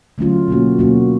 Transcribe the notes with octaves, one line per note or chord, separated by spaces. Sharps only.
D3 F#3 A3 C#4 F4
B2 F#3 A#3 C#4 F#4
B2 F#3 A#3 C#4 F#4